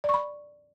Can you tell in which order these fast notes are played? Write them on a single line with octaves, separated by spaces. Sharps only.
D5 C#6 B5